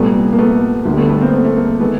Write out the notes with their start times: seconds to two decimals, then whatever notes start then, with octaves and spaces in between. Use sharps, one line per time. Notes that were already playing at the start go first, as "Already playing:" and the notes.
Already playing: C2 A#2 G3 A3 B3
0.33 A#3
0.38 A3 B3
0.85 D2 D3 G3
0.97 A3 B3
1.09 A3 B3
1.21 A#3 C4
1.33 A3 B3
1.45 A3
1.56 A#3
1.69 A#3
1.80 D#3 G#3 A3 B3